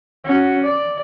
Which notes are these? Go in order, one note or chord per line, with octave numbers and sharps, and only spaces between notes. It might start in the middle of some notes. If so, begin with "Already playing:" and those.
C#4 F#4
D5